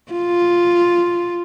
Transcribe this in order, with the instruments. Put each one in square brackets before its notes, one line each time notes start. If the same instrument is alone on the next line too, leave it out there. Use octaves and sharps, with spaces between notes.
[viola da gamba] F4